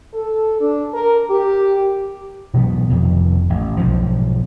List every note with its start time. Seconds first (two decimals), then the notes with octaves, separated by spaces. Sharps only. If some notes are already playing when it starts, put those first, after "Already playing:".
0.14 A4
0.60 D4
0.93 A#4
1.30 G4
2.54 B2 E3 F#3 B3
2.89 F1 F2 D#3
3.50 A1
3.77 B1 G#2 F3